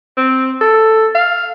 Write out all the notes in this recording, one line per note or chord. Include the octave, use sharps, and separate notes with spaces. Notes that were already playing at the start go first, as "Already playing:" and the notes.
C4
A4
F5